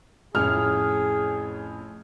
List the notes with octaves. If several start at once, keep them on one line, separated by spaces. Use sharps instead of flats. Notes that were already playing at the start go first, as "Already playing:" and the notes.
F2 A2 C#4 G#4 F6